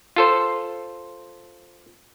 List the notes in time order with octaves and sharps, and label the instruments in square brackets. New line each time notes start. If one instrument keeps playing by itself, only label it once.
[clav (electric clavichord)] F4 A4 C5